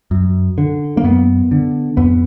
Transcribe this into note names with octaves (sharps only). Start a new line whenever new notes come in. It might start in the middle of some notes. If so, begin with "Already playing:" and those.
F#2
D3
A#3
F#2 B3
D3
F2 B3